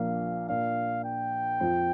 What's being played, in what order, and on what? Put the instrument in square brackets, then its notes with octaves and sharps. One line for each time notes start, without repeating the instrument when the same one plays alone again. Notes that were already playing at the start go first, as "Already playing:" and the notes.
Already playing: [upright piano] A#1 A#2 F3 A#3 D4 [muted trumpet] F5
[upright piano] A#2 A#3 D4 F4 [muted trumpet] F5
[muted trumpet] G5
[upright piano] F2 F3 C4